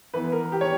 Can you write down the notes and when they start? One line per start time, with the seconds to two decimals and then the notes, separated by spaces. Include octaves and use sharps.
0.14 E3 B3 B4
0.32 A#4
0.52 G4
0.61 C#5